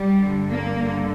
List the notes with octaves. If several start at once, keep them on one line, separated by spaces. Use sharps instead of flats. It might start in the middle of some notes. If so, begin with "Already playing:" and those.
Already playing: G3
G2 D3
A#3
G2 D3